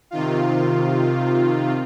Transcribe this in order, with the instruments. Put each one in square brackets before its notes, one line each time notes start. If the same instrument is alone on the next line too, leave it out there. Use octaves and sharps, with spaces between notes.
[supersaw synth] C3 D#3 F4